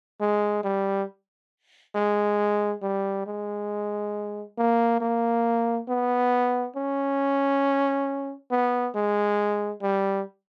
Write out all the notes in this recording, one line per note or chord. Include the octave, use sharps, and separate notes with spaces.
G#3
G3
G#3
G3
G#3
A#3
A#3
B3
C#4
B3
G#3
G3